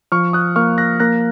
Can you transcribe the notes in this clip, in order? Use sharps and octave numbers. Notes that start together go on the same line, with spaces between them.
F3 C#6 F6
D#6 F#6
A#3 C#6 F6
F#6 A#6
A#3 F#6 A#6